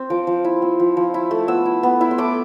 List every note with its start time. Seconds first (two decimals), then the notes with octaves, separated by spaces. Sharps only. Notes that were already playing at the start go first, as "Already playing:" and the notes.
Already playing: C4
0.10 F3 D6
0.27 F3
0.44 E4
0.62 C4
0.80 F3
0.97 F3
1.14 E4
1.31 A3
1.48 B3 E6
1.65 E4
1.83 B3
2.01 E4
2.11 C6
2.18 A3 D6